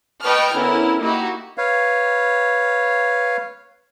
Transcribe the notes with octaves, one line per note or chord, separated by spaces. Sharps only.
B4 D#5 G5 A5 C#6 F6
D3 B3 C#4 E4 A#4
A#3 D#4 E4 F#4 G4
B4 C#5 F5